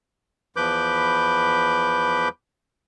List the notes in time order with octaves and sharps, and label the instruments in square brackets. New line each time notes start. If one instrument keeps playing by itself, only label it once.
[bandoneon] E2 F3 B4 B5 D6 G6